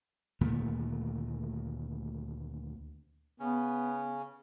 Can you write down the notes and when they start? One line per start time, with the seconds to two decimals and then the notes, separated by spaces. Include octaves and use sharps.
0.41 D2 A#2 D#3 A3
3.40 C#3 B3 C#4